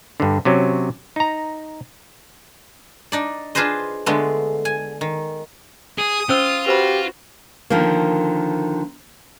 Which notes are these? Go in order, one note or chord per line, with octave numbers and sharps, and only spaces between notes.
G2 D3
C3 F#3 C#4
D#4 A#5
D4 D#4 D5
D4 F4 G#4 B4 C5 D#5
D3 G#3 A3 B3
G#5
D#3
G#4 D#6
C#4 F4 C5 E6
F#4 G4 B4 C5 B5
D3 D#3 F3 A#3